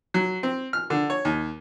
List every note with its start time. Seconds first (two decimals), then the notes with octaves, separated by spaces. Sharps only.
0.14 F#3
0.43 C4
0.73 F6
0.90 D3
1.10 C#5
1.25 D#2